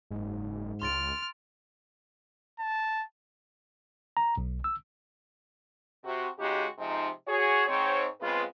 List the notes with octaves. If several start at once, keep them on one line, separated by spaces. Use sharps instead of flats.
F#1 G#2
C#2 C6 F6 A6 D7
A5
A#5
B1
E6
C3 F#4
C#3 G#3 D#4 F#4 G4
C3 F3 G#3 D#4
F#4 G#4 C#5
G#2 C4 C#5
C#3 G#3 B3 C4 F4 B4